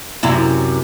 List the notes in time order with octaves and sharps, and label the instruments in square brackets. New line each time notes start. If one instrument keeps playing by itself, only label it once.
[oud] F#2 C3 E4